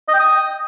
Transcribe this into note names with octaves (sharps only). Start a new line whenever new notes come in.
D#5
G5
D#6